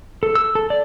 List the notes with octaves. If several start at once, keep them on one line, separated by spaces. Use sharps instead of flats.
A4
E6
A4
D5